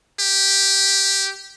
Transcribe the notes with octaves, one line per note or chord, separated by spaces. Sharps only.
G4